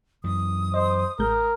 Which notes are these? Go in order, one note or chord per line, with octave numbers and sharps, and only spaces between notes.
F#2 E3 D#6
C5 D#5
A1 G#3 A#4 G6